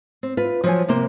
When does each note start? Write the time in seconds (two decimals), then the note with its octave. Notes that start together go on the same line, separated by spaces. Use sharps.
0.23 C4
0.37 F4 B4
0.64 F3 F#3 G#5
0.88 C3 A#3 C5